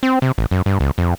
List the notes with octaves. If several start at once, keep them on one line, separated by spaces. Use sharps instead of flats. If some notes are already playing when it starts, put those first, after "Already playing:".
C4
C3
A1
F#2
G2
C#2
F2